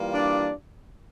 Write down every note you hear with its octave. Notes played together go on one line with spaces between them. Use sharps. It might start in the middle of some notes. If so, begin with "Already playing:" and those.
Already playing: E3 G3 A#3 F4
D4 D5